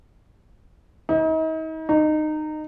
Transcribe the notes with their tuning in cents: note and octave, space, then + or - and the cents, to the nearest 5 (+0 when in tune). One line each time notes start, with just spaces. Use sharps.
D#4 +40
D#4 -20